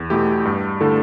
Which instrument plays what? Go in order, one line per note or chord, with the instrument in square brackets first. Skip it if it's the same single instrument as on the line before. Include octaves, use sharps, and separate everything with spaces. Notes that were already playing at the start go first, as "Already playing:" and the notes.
Already playing: [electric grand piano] E2
B2 A3 E4 G4
G2
D3 A3 E4 A4